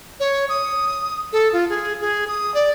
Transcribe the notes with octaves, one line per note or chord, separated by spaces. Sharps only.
C#5
D#6
A4
F4
G#4
G#4
D#6
D5